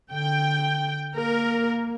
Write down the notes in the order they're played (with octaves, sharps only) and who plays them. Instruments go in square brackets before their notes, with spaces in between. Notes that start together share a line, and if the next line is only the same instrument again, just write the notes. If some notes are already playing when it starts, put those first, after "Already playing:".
[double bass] D3 [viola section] G5
[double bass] A#3 [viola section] A#4